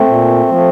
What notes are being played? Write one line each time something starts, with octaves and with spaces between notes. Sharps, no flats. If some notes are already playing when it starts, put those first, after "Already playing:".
Already playing: A3 C4
A#2
F3 A3